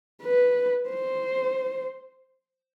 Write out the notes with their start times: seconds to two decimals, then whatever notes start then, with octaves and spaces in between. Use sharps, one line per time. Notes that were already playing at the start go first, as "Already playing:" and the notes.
0.23 B4
0.89 C5